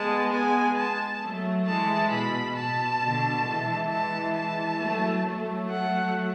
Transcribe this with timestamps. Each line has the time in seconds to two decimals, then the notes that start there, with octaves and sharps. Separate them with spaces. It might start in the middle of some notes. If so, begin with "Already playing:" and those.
Already playing: G#3 B3 A5
0.32 G#3 B3 G#5
0.78 A5
1.23 F#3 A3
1.67 E3 G#3 A5
2.12 B2 B5
2.56 B2 A5
3.02 B2 D3
3.46 E3 G#3
3.90 A5
4.35 A5
4.79 F#3 A3
5.25 F#3 A3
5.70 F#5